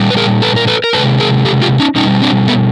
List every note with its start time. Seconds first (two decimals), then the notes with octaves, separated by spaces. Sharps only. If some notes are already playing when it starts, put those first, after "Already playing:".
Already playing: A#2 G3
0.10 B4
0.17 G#4 A#4
0.42 A4 B4
0.56 A#4
0.67 A4 B4
0.84 A#4
0.93 C3 F3 G#3 A4 B4
1.20 G#4 A#4
1.45 G4 A4
1.62 F4 G4
1.79 C#4 D#4
1.96 B2 G3 C#4 D#4
2.22 C4 D4
2.48 A3 B3